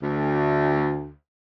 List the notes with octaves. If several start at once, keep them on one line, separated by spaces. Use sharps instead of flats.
D2